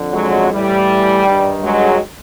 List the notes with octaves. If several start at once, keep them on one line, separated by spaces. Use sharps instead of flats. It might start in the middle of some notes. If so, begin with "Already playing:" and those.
Already playing: F2 D3
F#3 G#3
A2 E3 G3
G2 D#3
F#3 G#3